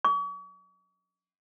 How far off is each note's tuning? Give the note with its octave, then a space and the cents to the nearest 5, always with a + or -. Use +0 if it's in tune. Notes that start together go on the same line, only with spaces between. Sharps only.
C#6 +45